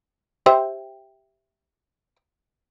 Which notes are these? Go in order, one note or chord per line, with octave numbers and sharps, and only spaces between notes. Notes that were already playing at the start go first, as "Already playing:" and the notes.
G4 C5 E5